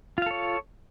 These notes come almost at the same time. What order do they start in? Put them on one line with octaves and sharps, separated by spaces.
F4 F5 A4 C#5